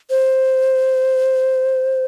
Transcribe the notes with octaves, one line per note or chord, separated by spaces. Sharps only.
C5